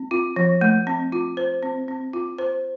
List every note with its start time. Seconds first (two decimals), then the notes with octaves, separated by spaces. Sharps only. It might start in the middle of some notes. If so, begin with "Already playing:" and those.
Already playing: C4
0.11 F4
0.36 F3
0.61 A3
0.87 C4
1.12 F4
1.37 C5
1.63 C4
1.88 C4
2.13 F4
2.38 C5